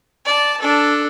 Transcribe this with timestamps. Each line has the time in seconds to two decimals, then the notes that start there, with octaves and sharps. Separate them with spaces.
0.25 D5 A5
0.61 D4 A4